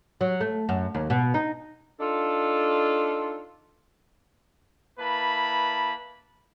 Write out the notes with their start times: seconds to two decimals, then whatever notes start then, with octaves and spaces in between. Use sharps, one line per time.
0.21 F#3
0.41 A3
0.69 F#2
0.95 D#2
1.10 B2
1.34 D#4
2.00 D4 D#4 F4 A4
5.00 A#3 E4 B4 A5 B5